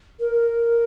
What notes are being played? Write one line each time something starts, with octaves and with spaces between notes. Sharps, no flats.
A#4